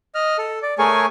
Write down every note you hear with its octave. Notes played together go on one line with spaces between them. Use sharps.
D#5 F6
A4
D5
A3 G#4 A#4 C#5 G#5 C#6